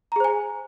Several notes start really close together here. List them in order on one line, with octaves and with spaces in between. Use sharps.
A#5 G#4 C5 G#5